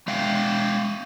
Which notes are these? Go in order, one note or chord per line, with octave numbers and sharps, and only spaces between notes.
G#3 E5 F5 G5